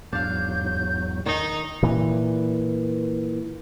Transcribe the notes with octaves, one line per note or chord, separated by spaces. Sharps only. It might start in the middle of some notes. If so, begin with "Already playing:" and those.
E2 G#2 F#3 D4 F5 G6
D#3 D#4
A#2 E3